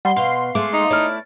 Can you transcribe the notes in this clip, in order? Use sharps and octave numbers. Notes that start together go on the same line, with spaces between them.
G3 F#5 C6
B2 F5 C6 C7
G#3 A3 D6
D#4
A3 E4 C#5 D5 F6